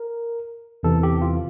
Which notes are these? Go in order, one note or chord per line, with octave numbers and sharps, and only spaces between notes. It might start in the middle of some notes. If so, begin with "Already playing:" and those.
Already playing: A#4
E2 C3 E3 A4
G4
F4